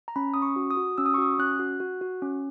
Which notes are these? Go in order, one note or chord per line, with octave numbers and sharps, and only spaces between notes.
A#5
C#4 B5
C#4 D#6
C#6
F#4
D#6
F#4
C#4 E6
D#6
C#6
F#4 D#6
C#4 F#6
F#4
F#4
F#4
C#4